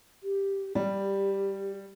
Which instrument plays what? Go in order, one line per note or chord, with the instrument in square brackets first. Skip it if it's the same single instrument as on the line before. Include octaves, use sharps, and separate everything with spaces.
[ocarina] G4
[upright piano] G3 [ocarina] G4